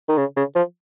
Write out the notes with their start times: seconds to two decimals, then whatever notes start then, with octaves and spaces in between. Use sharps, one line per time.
0.08 D#3
0.18 C#3
0.37 C#3
0.55 F3